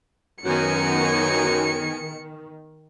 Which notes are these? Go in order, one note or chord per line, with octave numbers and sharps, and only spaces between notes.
F#2 D#3 B3 D#4 G#5 C#7